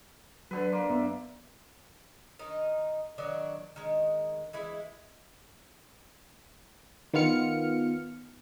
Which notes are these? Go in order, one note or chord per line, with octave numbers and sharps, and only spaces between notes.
D3 F#3 B4
A#3 C6
F#2 B3 E5
D#3 D#4
D#3 F#3 D4 D5
D#3 G#3
E3 G#3 E4
D#3 B3 F4 F6 C#7